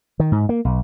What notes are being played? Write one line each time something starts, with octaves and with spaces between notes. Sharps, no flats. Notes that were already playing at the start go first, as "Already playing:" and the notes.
D#3
G#2
A#3
B1